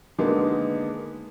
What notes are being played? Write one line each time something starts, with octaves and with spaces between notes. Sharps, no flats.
D3 D#3 G#3 A#3 B3